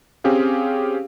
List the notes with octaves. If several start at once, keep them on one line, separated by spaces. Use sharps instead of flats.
C4 C#4 G4 G#4 F5